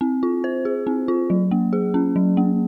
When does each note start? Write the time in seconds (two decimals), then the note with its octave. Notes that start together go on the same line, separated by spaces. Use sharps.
0.01 C4
0.23 F4
0.44 C5
0.65 G#4
0.87 C4
1.08 F4
1.30 F#3
1.51 A#3
1.73 G#4
1.94 C#4
2.16 F#3
2.37 A#3